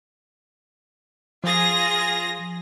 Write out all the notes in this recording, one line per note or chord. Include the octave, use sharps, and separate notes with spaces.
F3 F4 G#4 A#6